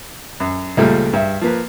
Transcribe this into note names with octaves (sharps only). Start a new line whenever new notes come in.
F#2
C#2 A#2 F3 G3 A3
G2 E5
F3 A#3 B4